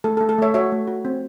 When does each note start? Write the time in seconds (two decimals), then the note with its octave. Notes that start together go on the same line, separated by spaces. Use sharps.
0.04 A3 A4
0.17 A4
0.21 A3
0.29 A4
0.38 A3 C#5 E5
0.54 F#4 C#5 E5
0.72 A3
0.87 F#4
1.05 C4